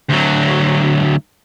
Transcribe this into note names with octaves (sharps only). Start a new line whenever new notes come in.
D2 F#3